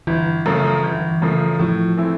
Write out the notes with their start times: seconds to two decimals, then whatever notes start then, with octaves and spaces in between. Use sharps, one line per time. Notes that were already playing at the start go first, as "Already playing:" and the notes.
0.07 G1 E3
0.46 F#2 C#3 F3 A3
0.83 G1
1.22 F#2 C#3 F3 A3
1.59 A2 F3
1.97 E3 A3 C4 E4